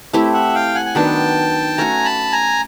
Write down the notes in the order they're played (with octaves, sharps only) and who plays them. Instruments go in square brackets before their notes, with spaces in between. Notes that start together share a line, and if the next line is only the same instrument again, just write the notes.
[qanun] A3 C4 E4 G4
[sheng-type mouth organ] E5 F#5
F5 G5
F#5 G#5
G#5
[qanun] D#3 F#3 B3 D4 [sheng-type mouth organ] G5 A5
[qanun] A3 C#4 F#4 [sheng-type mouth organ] G#5 A#5
[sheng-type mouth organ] A5 B5
G#5 A#5